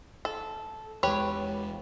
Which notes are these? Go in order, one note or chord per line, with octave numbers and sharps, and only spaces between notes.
A4
E2 G#3 G4 B4 C#5